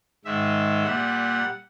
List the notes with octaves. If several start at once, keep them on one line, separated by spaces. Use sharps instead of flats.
G#2 D#3 G#3 E5
A#2 G3 F#5